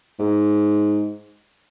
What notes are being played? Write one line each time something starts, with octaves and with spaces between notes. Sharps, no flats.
G#2